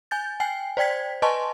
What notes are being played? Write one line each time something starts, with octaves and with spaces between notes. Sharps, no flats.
G#5 G6 A6
G5 G#5 C7
C5 D5 G5 G#6 B6
B4 D#5 G#5 A5 C6 C#6